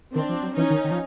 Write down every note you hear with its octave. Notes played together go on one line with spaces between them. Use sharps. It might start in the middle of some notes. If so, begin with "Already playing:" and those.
D#3 C4 D4
F3
F#3
E3 C#4 D#4
D#3
D#3
F3